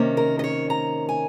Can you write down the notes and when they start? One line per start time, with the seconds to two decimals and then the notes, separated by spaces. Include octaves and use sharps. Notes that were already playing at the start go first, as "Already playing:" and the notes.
Already playing: C3 D#3 A#3 C#4
0.17 A#4
0.39 D#5
0.44 C#5
0.70 A#5
1.09 G#5